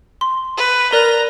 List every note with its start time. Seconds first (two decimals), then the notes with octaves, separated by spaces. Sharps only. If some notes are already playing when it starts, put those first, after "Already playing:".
0.21 C6
0.57 B4
0.93 A#4 D5 A#5 F#6